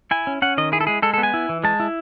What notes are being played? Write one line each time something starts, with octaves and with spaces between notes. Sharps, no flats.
E4 G#5
C#4
C#4 F#5
D#3 D#5
E4 G#4
A4
G#3 G#4
G#3 A4
A4
B3
G#5
E4
E3
G#3 A5
E4